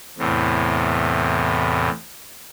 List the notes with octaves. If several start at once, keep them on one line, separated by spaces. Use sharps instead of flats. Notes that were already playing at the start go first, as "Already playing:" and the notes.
E2 A2 C3